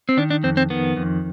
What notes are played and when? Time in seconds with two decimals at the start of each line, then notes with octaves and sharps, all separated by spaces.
0.09 C4
0.17 D#3 D4
0.30 D4
0.43 F2 C4
0.57 C4
0.70 D#3 B3
0.97 F2